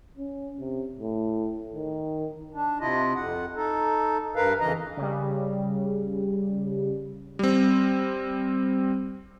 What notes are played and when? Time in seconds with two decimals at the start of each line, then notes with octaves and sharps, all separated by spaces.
0.17 C#4
0.60 C3
1.00 A2
1.73 D#3
2.55 D4
2.81 C3 E4 F4 D#5
3.15 F2 F#5
3.56 D#4 A4
4.36 G2 A#4 B4 F5
4.60 F2 C#3 E3 D#5 A#5
4.97 C#3 G3
7.39 G3 C4